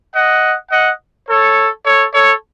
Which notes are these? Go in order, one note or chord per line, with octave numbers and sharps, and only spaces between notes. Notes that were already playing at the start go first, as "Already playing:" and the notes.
D#5 F#5
D#5 F#5
A4 C#5
A4 C#5
A4 C#5